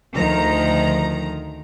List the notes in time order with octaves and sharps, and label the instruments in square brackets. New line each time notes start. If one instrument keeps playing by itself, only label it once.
[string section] D2 D#3 F3 A#5